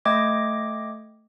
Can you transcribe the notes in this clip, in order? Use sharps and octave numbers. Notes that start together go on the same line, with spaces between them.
A3 D#5 G5 D6 G#6 A#6